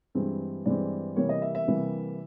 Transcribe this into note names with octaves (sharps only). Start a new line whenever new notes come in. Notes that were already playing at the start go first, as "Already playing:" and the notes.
G2 E3 G#3 C4
G2 E3 G#3 C4 D5
C3 E3 G3 A#3 C#5
D#5
E5
E5
C3 E3 G3 A#3